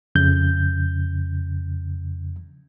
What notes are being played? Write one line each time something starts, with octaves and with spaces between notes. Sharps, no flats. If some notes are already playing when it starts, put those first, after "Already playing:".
F2 C#3 G6